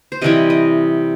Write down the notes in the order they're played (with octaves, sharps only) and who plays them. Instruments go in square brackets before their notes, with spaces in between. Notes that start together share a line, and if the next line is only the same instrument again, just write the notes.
[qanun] C5
C3 E3 G3 D#5
D#5